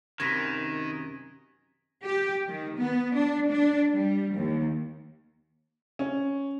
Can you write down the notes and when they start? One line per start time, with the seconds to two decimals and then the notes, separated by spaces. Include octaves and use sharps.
0.20 F#2 C3 D#3 B4 G#6 A#6 B6
2.05 G4
2.47 D#3
2.78 B3
3.15 D4
3.50 D4
3.92 G3
4.32 D#2
5.99 C#4